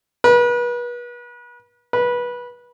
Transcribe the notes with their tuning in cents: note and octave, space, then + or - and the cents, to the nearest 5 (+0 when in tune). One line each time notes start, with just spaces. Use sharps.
B4 -35
B4 -20